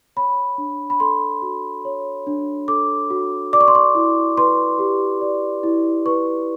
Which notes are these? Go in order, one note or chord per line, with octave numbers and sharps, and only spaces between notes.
C#5 B5
D4
B5
A4 C6
F#4
C#5
D4
A4 D6
F#4
D5 D6
C#6
C6
C#6
E4
B4 C6
G4
D5
E4
B4 C#6